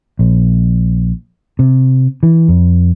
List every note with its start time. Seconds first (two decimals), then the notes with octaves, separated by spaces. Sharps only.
0.19 A#1
1.59 C3
2.23 E3
2.48 F2